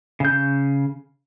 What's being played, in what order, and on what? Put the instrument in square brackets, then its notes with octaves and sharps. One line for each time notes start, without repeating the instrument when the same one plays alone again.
[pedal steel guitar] C#3 G6